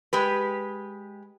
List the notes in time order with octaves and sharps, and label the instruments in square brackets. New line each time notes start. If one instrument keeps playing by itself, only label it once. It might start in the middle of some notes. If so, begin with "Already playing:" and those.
[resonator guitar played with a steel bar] G#3 G4 B4